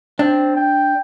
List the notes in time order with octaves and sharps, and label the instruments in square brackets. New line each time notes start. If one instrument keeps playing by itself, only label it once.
[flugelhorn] C4 [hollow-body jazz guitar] D4
[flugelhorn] G5